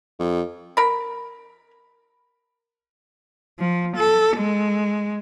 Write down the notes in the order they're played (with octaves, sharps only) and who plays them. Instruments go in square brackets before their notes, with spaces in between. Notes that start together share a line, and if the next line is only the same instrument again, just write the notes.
[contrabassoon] F2
[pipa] A#4 B5
[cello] F3
A4
G#3